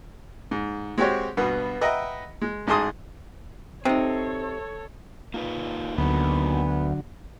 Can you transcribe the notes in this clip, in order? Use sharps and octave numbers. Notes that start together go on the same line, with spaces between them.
G#2
G#3 C4 F#4 G4 C#5
G2 B2 B3
B4 D#5 E5 F#5 G5 A#5
G#3
A1 G#2 G#4 A5 C6 D#6
C3 C4 D#4 A4 C#5
A#3 D#4 F4 B4
D2 D3 F#3 B3